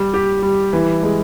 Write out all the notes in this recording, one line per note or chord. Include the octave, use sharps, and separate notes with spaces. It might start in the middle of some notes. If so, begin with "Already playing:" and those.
Already playing: G3
G4
G3
E3
G#3